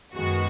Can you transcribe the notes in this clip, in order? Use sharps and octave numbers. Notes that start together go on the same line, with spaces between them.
F#2 D#3 G#3 B3 F#4